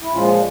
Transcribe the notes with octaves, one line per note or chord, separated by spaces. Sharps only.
E4
A#2 F3 G#3 C#4 F4